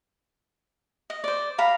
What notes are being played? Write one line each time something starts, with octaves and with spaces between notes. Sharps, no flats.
D#5
C5 D5
F5 A#5 B5